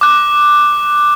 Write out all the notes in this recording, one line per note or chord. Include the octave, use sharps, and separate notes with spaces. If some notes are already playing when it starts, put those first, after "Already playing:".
D6 F#6